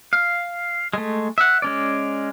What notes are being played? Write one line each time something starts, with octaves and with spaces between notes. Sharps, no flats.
F5
G#3 A3
E5 F#5
G#3 C#4 D5